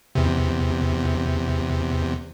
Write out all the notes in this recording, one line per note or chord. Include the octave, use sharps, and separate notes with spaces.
E2 C3